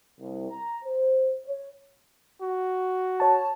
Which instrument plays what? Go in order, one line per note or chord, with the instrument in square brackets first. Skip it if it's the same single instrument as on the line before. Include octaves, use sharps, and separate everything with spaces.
[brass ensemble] C2
A#5
C5
C#5
[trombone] F#4
[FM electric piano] C#5 A5